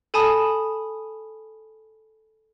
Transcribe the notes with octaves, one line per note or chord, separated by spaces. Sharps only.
A4 G#5 A5 B5 D#6